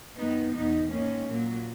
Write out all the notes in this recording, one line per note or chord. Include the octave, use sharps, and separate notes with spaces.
F#2 D#3 B3 D#4
E2 B2 B3 D#4
G#2 D#3 A#3 C#4
A#2 F#3 A#3